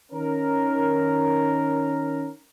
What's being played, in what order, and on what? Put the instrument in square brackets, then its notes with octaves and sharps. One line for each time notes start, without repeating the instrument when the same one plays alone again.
[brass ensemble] D#3 C#4 A#4